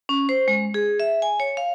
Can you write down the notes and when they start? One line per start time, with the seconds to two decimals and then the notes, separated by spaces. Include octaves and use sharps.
0.09 C#4
0.29 C5
0.48 G#3
0.74 G#4
1.00 E5
1.22 G#5
1.40 C#5
1.57 F5